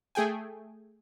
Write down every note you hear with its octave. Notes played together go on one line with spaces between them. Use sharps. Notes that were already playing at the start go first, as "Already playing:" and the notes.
A3 G#4 G5 G#5